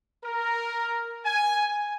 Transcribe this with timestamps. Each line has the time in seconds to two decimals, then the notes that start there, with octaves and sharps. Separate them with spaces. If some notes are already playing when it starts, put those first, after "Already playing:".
0.24 A#4
1.25 G#5